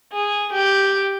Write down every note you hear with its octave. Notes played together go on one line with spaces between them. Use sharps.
G#4
G4